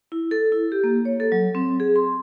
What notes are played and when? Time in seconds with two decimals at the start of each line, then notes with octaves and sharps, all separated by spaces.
0.12 E4
0.31 A4
0.52 E4
0.72 G4
0.84 A#3
1.05 C#5
1.20 A4
1.32 F#3
1.55 C4
1.80 G#4
1.96 C6